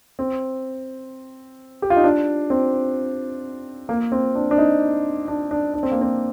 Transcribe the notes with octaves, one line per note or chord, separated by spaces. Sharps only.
C4
G4
F4
D#4
D4
C4
A#3
C4
D4
D4
D#4
D4
D4
D4
C4
A#3
C4